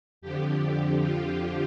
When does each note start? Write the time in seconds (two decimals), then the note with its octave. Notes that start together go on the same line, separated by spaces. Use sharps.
0.22 F2 D3 F3 G4
1.02 F4